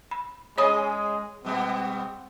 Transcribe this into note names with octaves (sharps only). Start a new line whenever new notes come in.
B5
G#3 C#4 G#4 C#5 D#5 B5 D#6
B2 G3 B3 C4